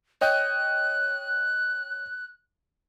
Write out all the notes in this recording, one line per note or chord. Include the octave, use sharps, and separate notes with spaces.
C#5 D#5 G5 F#6